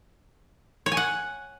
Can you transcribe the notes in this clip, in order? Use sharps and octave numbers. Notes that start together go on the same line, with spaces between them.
C#5
G#5
F#5